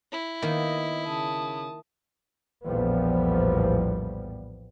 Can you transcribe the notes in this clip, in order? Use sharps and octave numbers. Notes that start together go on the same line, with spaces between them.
E4
D#3 A#3 B3 D#5 G5
C#3 A5 D#6
A#1 E2 A2 F3 G3 B3